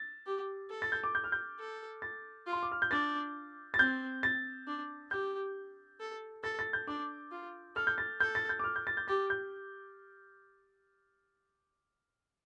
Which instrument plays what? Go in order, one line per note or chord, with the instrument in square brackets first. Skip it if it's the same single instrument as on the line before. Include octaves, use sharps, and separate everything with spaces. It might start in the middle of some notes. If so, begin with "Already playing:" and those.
Already playing: [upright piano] A6
[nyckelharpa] G4
A4
[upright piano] A6
G6
D6
G6
F6
G6
[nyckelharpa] A4
[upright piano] A6
[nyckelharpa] F4
[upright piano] C6
D6
F6
G6
[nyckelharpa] D4 [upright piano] A6
[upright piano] A6
[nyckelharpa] C4 [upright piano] G6
[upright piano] A6
[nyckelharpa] D4
[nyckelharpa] G4 [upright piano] G6
[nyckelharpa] A4
[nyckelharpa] A4 [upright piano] A6
[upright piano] A6
G6
[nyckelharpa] D4 [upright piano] D6
[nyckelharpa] F4
[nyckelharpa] A4 [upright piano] F6
[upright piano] G6
A6
[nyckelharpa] A4 [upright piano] G6
[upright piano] A6
G6
D6
F6
G6
A6
G6
[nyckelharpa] G4 [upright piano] A6
[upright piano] G6